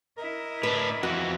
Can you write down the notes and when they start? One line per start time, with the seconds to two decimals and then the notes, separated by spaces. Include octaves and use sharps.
0.18 E4 A#4 D#5
0.63 A2 D4 B4
1.03 F2 E3 F#4